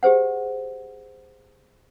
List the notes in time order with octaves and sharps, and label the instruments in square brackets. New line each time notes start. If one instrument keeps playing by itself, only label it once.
[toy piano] G4 G#4 C5 F#5